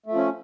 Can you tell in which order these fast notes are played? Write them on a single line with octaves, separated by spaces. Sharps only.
A3 F3 C#4